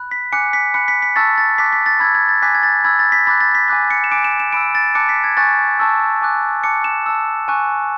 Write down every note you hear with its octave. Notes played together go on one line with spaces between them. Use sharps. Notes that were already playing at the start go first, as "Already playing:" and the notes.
Already playing: B5 F#6
B6
G#5 D6 F#6 C#7
B6
B5 F#6 C#7
B6
B6
A5 C#6 E6 A6
A6
A5 D6 F#6 B6
B6
A6
B5 E6 G#6
G#6
A6
G#5 D6 F#6 B6
G#6
A6
B5 E6 G#6
A6
B6
B5 D6 F#6 A6
A6
B6
G#5 B5 D6 F#6 B6
C#7
E7
G#5 D6 F#6 D7
E7
E7
B5 E6 D7
A6
A5 D6 F#6 C#7
B6
G#6
G#5 C#6 F#6 A6
A5 C#6 E6
G#5 D6 F#6
A5 D6 F#6 C#7
E7
A5 E6
G#5 C#6 F#6